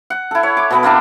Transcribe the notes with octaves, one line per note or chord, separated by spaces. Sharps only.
F#5
E4 A4
C#5
D6
B2 B3 B5
A#3 B3 D4 E5